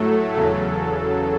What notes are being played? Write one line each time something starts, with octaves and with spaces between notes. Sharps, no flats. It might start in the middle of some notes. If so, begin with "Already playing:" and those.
Already playing: A2 F#3 A3 A4
E2 C#3 F#3